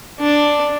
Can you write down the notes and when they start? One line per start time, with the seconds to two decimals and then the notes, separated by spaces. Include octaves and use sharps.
0.21 D4